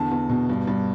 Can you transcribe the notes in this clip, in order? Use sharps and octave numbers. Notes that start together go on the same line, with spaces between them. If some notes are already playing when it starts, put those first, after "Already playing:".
Already playing: E2 D3 A5
E2
B2
G2
G2